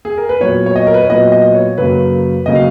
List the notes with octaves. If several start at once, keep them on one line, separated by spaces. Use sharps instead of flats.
G#4
A#4
B4
A#2 F#3 B3 C#5
C#5
D#5
A#4
B4
C#5
A#2 F#3 B3 D#5
D#5
C#5
F#2 C#3 F#3 A#3 B4
C#3 F#3 A#3 D#5
F5